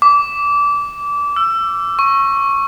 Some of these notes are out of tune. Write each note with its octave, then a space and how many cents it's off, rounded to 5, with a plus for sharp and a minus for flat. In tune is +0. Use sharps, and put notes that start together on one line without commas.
D6 -25
E6 +25
C#6 -10